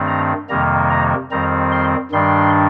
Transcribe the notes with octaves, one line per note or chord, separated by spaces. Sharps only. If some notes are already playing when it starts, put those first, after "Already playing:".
Already playing: G2 D#3 A3 C4
A#5
F2 C3 D#3 G3 A#3 A#5
A#5
F2 D#3 G3 C4 A#5
C6
G2 D#3 G3 D4 C6